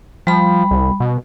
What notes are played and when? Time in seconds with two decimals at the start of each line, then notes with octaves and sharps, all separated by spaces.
0.27 F3 G3 B5
0.71 C2
1.00 B2